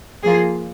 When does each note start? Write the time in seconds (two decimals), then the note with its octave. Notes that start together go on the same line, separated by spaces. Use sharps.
0.23 F3 A#3 F4 G#4